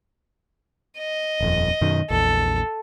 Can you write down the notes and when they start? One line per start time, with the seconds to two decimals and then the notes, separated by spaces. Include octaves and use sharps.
0.98 D#5
1.41 D#1 F2
1.81 F#2 B2 D#3
2.10 A#1 E2 A4